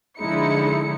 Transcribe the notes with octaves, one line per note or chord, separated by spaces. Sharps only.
D3 F3 G#3 D#4 E4 C#7